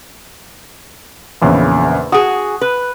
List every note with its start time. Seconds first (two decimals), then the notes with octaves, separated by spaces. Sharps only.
1.41 A#1 E2 C#3
2.12 F#4 G#4 D#6
2.61 B4